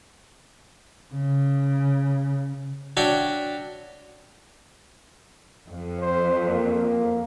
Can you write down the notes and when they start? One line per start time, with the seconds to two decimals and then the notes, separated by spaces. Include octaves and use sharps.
1.12 C#3
2.97 D4 F#4 C#5 E5 G5
5.70 F2
6.00 C5
6.49 A#3